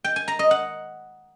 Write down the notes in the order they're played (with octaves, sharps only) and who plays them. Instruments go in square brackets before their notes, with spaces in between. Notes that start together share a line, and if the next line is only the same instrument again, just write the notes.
[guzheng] G5
G#5
A#5
D#5
F#5